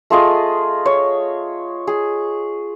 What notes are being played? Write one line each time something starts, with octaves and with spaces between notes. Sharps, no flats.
A3 F4 G#4 D#5
C#5
G#4